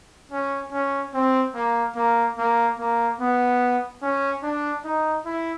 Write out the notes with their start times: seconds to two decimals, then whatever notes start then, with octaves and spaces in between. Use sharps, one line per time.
0.31 C#4
0.72 C#4
1.14 C4
1.54 A#3
1.95 A#3
2.38 A#3
2.79 A#3
3.20 B3
4.02 C#4
4.43 D4
4.84 D#4
5.26 E4